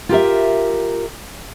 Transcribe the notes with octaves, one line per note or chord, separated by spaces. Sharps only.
F4 G4 A#4 E5